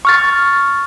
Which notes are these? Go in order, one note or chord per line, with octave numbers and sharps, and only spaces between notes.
C#6 F6 A6